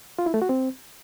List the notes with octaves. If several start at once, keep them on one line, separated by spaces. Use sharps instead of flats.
F4
E4
A3
F#4
C4